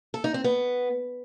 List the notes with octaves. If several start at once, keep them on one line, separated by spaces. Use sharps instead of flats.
A4
D#4
C4
B3